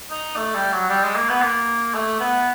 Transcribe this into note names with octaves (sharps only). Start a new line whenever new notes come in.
D#4
A3
G3
F#3
G3
G#3
A#3
B3
A#3
A3
B3